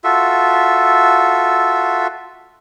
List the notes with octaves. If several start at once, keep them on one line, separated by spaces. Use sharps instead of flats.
F4 F#4 A4 E5